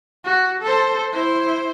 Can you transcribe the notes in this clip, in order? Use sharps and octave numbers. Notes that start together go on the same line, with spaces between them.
F#4
A4 C5
E4 C5